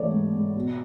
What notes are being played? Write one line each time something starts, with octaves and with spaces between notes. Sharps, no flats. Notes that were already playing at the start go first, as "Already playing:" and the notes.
Already playing: E3 A3 C#5 D5
G#2
G#2
B2